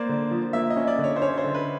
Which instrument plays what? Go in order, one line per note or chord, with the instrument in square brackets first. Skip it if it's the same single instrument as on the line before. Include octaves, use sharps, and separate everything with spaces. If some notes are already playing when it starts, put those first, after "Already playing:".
Already playing: [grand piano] A#3 [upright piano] C5 D5
[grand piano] D3
F3
[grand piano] A#3 [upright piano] E5
[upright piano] D#5
[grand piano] C#4
[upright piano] D5
[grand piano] D3
[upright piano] C#5
C5
[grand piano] C#4 [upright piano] C#5
[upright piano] C5
[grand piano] D3
[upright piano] B4